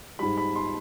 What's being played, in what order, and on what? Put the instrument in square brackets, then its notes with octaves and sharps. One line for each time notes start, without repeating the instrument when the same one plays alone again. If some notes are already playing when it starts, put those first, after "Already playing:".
[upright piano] G#2 G3 B5
B5
C6